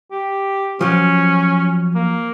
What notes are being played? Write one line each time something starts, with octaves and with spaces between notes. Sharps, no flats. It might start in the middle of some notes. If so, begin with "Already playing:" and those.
G4
F3 F#3 C#4
A#3